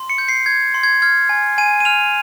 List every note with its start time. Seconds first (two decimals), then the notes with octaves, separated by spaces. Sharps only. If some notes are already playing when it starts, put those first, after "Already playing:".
Already playing: C6
0.10 C#7
0.18 G6
0.28 C7
0.46 G6 G#6
0.74 C6
0.83 G#6
1.02 F6 G#6
1.29 G#5
1.58 G#5 D#7
1.80 D#7
1.85 F6 F7